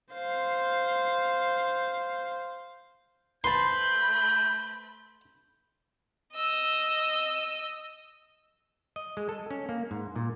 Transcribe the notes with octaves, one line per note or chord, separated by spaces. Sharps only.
C5 F5
A3 B4 C5 A5 B5 C6 G6
D#5 E6
D#5
G#3
A4
C#4
A#3
G#2
A#2